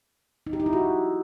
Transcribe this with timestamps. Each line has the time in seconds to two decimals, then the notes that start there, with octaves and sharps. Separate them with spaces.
0.47 D#4
0.53 G4
0.60 D#4
0.66 E4
0.73 F#4